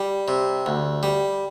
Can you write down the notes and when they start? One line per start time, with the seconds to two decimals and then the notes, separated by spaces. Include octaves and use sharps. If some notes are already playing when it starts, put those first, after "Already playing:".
Already playing: G3
0.28 C3
0.66 D2
1.03 G3